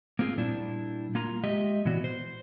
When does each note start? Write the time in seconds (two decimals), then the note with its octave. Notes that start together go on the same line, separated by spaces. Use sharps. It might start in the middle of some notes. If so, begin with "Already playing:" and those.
0.19 A#3 C4 F4 G#4
0.38 A#2 G3 D4 E4
1.15 A#3 F4 A#5
1.44 G#3 G4 D#5 E5
1.85 A#2 E3 B3 F#4 D5
2.04 C5